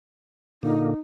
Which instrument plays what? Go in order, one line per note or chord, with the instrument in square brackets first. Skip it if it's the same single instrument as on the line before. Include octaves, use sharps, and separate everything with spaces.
[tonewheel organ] A#2 D3 A#3 [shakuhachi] D#4